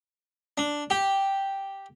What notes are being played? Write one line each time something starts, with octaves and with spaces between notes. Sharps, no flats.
D4
G4